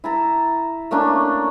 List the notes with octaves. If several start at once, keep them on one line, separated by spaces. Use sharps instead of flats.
E4 A5 A#5
A3 A#3 C#4 D4